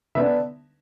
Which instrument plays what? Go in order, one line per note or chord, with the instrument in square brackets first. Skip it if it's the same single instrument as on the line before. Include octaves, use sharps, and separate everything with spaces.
[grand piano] D3 B3 D4 E5